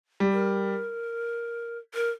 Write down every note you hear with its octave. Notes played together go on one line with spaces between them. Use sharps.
G3
A#4
A#4